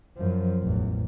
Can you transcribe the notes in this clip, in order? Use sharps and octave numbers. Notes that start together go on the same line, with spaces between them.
F#2 F3
A1 E2